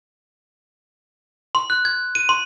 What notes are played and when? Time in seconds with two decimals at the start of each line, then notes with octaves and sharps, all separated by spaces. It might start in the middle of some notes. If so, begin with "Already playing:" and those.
1.55 C6
1.70 F#6
1.85 G#6
2.15 D#7
2.29 C6